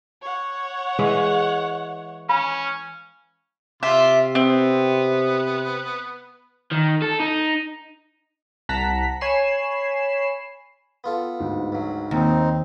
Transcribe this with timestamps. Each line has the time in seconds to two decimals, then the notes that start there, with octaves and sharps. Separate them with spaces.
0.22 C#5 F#5
0.99 E3 G#3 E4
2.29 C#4 F5 B5
3.83 C3 F4 E5 C6 D6
4.35 B3 C4
6.72 D#3
7.02 A4
7.20 D#4
8.69 C2 F#5 A5 A#5 B6
9.21 C#5 G#5 B5 C7 E7
11.04 B3 F4 A4
11.40 D2 G#2
11.72 G2 F#3
12.11 D#2 C4 D#4